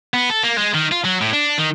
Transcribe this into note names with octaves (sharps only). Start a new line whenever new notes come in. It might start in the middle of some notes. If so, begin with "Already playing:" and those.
B3
A4
A#3
G#3
D#3
F4
F#3
A2
D4
D#3